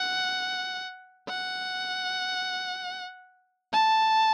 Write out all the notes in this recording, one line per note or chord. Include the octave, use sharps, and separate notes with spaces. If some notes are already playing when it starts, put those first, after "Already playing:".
Already playing: F#5
F#5
A5